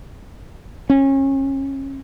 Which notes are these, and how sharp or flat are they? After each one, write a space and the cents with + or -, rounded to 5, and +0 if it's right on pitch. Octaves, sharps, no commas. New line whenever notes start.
C#4 -30